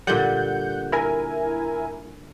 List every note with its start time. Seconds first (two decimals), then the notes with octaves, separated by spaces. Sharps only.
0.07 A#2 D3 G3 F#5 G6
0.92 E4 A#4 G#5